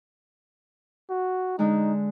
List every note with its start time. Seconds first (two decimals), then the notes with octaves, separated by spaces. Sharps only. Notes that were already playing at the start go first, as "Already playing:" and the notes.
1.10 F#4
1.59 D3 G#3 D#4